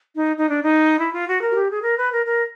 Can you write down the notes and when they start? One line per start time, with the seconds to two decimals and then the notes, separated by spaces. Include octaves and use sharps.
0.14 D#4
0.36 D#4
0.49 D4
0.62 D#4
0.99 E4
1.13 F4
1.28 F#4
1.42 A#4
1.51 F#4
1.56 G4
1.70 G#4
1.83 A#4
1.97 B4
2.12 A#4
2.26 A#4